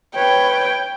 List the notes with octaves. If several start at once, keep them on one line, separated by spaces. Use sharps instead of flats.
B4 C#5 G5